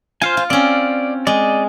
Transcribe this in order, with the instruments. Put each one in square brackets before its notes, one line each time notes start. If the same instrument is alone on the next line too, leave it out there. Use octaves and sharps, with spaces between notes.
[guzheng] F4 [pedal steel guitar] C5 F5 G#5
[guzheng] F4
[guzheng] C4 C#4 [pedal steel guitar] D5
[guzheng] G#3 [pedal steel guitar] D5 D#5